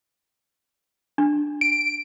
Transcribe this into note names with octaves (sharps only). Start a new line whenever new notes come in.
D4
D7